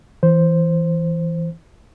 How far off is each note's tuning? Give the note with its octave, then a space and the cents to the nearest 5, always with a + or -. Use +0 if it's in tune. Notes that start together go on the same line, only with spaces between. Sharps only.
E3 +0 C5 +0